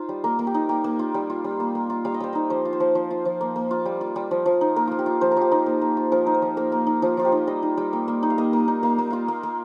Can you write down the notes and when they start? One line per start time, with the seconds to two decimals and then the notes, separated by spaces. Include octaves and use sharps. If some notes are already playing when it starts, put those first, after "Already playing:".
Already playing: D#4 F4 C5
0.09 G3
0.24 A#3 A#4
0.39 A#3
0.47 G4
0.54 D#4
0.69 A#3 G4
0.84 A#3
0.99 F4
1.14 G3
1.30 F4
1.44 G3
1.60 A#3
1.75 A#3
1.90 F4
2.05 G3 F5
2.14 D#5
2.20 G3 C5
2.33 D#4 D#5
2.50 F3 C5
2.65 F4
2.73 C5
2.80 F3
2.95 F3
3.11 F4
3.25 F3
3.41 A#3
3.56 A#3
3.71 F4
3.85 G3
4.01 F4
4.16 G3
4.31 F3
4.46 F3
4.61 D#4
4.76 A#3 A#4
4.88 A#3 F4
4.99 G4
5.06 F4
5.21 F3 C5
5.31 A#4
5.37 F3 G4
5.51 D#4 A#4
5.66 A#3
5.81 A#3
5.97 F4
6.12 F3 A#4
6.27 D#4
6.34 C5
6.42 F3
6.57 A#3 A#4
6.72 A#3
6.87 D#4
7.02 F3 F4
7.17 F3 F4
7.25 G4
7.32 D#4
7.47 G3 D#5
7.63 D#4
7.77 G3
7.93 A#3
8.08 A#3
8.23 D#4
8.30 F5
8.38 A#3 D#5
8.53 A#3
8.68 D#4
8.83 A#3 F5
8.98 A#3
9.11 F4 F5
9.28 A#3
9.43 A#3